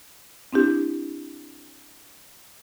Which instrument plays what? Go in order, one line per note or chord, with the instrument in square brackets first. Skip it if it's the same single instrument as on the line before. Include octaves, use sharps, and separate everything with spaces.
[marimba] C4 D4 E4 G4